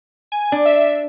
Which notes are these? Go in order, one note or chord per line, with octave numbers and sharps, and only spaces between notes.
G#5
D4
E5